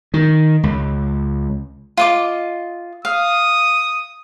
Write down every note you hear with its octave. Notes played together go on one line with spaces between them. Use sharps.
D#3
C#2
F4 D#5 D6
F5 D#6